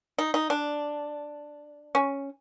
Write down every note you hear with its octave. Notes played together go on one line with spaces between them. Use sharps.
D#4
D#4
D4
C#4